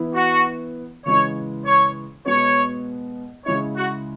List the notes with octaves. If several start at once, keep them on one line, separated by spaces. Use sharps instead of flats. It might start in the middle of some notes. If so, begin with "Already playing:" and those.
Already playing: E3 B3 E4
F#4
C#3 E3 G#3 C#5
C#5
B2 G#3 B3 C#5
C#3 G#3 E4 C#5
F#4